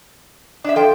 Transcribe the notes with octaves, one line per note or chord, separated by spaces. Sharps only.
D4 E5
F3 A4 G5